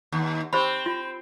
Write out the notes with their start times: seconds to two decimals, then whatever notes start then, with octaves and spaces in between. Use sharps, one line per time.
0.12 D#2
0.53 C4 G4 C5 B5
0.86 F4